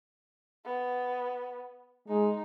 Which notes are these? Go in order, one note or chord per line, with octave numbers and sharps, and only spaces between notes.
B3
G#3 D#4